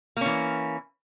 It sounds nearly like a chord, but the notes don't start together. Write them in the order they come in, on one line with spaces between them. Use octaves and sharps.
A#3 C#4 E3